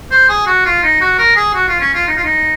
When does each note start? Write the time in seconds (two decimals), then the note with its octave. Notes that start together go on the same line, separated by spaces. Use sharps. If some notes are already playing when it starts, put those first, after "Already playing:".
0.11 C5
0.29 G#4
0.47 F#4
0.66 F4
0.83 D#4
1.01 F#4
1.19 A#4
1.36 G#4
1.54 F#4
1.68 F4
1.81 C#4
1.94 F4
2.08 D#4
2.16 F4
2.24 D#4